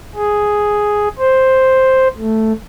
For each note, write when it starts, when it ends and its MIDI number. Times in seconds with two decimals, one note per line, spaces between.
0.15 1.08 68
1.19 2.08 72
2.17 2.53 57